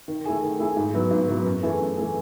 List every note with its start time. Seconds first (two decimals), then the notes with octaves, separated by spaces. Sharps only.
0.08 D#3
0.25 A3 E4 G#4
0.43 D#3
0.59 A3 E4 G#4
0.76 G#2
0.94 F#3 B3 E4
1.11 G#2
1.28 F#3 B3 E4
1.45 F#2
1.63 E3 A3 E4 G#4
1.80 F#2
1.97 E3 A3 E4 G#4